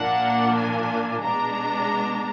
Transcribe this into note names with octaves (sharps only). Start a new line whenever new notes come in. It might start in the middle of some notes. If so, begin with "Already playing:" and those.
Already playing: A#2 F3 A#3 D4 F#5
G#5
B2 G#3 D4 A#5